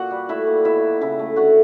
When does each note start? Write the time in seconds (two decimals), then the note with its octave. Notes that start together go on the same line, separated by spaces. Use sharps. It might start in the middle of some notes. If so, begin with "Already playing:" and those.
Already playing: A#2 F#4 F#5
0.11 G3
0.29 A3 E4 E5
0.47 A#2
0.65 B2 E4 E5
0.83 F#3
1.01 C#3 E4 E5
1.19 A3
1.36 D3 F#4 F#5